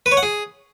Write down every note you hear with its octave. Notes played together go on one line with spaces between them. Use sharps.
B4
C#5
F#5
G#4